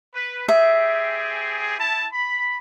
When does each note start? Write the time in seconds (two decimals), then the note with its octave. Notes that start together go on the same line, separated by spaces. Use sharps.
0.15 B4
0.48 C4 G4 G#4 E5
1.79 E4 A5
2.13 B5